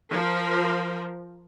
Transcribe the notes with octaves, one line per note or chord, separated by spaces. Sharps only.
F3 A#4